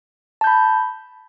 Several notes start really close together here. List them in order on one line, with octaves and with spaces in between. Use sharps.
A5 G6 B5